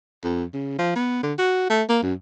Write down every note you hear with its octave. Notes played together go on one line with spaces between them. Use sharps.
F2
C#3
F3
B3
D3
F#4
A3
A#3
F#2